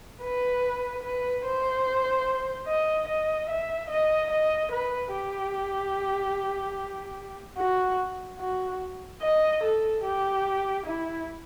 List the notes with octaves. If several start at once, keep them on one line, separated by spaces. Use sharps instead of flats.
B4
B4
C5
D#5
D#5
E5
D#5
D#5
B4
G4
F#4
F#4
D#5
A4
G4
E4